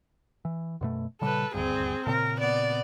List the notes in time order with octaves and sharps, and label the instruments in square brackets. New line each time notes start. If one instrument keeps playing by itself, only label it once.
[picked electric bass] E3
F#2 B2 A3
[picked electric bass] A#2 C#3 G3 [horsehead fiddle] A4 B4
[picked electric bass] D#1 D2 G2 [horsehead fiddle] C4 G#4
[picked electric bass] A#2 C#3 C4 [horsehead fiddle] A#4
[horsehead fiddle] B3 D5